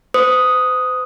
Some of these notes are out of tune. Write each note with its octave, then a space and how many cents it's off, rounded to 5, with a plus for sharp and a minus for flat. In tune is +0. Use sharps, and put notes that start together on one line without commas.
C5 -40 D#6 +0